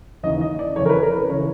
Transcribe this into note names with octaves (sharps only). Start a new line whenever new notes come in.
D#2 C#3 E3 D#5
D#5
D5
F2 C#3 E3 C#5
A#4
B4
A#4
B4
C#3 E3 C#5